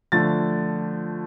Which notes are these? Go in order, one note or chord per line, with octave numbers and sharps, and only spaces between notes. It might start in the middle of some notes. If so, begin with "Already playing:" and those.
D3 F3 A3 A6